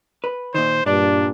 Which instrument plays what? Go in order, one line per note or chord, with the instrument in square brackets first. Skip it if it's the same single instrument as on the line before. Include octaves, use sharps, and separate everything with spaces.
[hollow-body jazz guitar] B4
[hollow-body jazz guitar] A#2 D#3 [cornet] C5
[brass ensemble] G2 A#2 [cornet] D4 [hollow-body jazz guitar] D5 A5